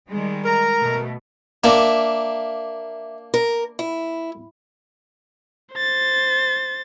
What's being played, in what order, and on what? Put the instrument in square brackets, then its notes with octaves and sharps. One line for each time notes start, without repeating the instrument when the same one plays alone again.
[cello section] D#3 G3 G#3
[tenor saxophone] A#4 [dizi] A#5
[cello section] B2 A3
[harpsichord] A#3 D4 [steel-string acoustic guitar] E5
[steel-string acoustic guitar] A#4
E4
[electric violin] C5 A6